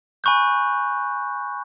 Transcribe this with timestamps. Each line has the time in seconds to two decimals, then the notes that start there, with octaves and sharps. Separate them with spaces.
0.24 G#5 B5 C#6 F#6 G6